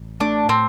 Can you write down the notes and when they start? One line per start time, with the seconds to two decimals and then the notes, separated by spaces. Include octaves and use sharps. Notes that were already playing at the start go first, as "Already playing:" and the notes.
Already playing: A1
0.20 A3 D4
0.48 A2 C4